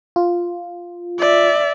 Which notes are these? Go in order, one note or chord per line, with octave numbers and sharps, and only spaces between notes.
F4
D5 E5